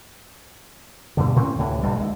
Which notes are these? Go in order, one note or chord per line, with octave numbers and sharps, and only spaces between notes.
G2 B2 D3
A2 C4 C#4
D2 A2 C3 E3
B1 G2 G3
D2 G#3